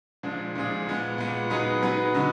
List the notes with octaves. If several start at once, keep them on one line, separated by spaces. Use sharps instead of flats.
A#2 F3 G#3 D4 G#4
A#2 F3 G#3 D4 G#4
A#2 G#3 B3
A#2 G#3 B3
F#3 B3 D#4 G#4 B4
F#3 B3 D#4 G#4 B4
D3 G#3 D#4 F#4